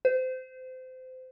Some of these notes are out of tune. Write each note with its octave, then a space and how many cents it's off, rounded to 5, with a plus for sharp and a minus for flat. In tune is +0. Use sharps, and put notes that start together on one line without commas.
C5 -25